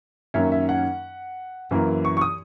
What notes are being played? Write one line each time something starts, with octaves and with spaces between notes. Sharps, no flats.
F#2 D#3 A#3 C#4 E5
E5
F#5
F#2 E3 A#3
C#6
C#6
D#6